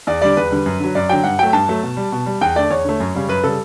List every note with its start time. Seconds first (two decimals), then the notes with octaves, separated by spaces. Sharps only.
0.07 E2 D5
0.22 D3 G3 D5
0.37 E2 B4
0.51 D3 G3
0.66 F#2
0.80 D3 F#3
0.95 F#2 D5
1.09 D3 F#3 G5
1.23 G2 F#5
1.39 F#3 A3 G5
1.53 G2 A5
1.68 F#3 A3
1.83 B2
1.97 G3
2.12 B2
2.26 G3
2.41 E2 G5
2.56 D3 A3 D5
2.70 E2 C#5
2.85 D3 A3
3.00 F#2
3.15 C#3 G3
3.28 F#2 B4
3.44 C#3 G3 A4